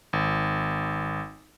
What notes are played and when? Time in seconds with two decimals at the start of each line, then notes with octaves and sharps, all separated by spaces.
0.13 G#1